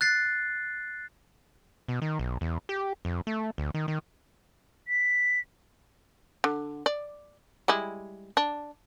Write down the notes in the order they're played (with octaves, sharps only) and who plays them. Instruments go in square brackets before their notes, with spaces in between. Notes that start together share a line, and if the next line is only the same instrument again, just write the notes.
[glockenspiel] F#6 A6 C7
[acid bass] B2
D#3
B1
E2
G4
F2
A3
D2
D#3
D#3
[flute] B6
[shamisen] D3
D5
G3 G#3 E4
D4